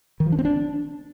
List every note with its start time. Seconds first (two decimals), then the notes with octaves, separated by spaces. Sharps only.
0.20 D#3
0.26 F3
0.32 D4
0.39 C4
0.45 D4